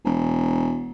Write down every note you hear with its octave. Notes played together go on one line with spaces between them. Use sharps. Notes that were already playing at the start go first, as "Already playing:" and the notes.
E1